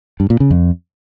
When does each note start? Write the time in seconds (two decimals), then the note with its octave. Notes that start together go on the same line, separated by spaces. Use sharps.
0.20 G2
0.30 A#2
0.40 C#3
0.51 F2